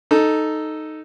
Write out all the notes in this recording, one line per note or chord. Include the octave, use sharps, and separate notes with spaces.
D#4 A4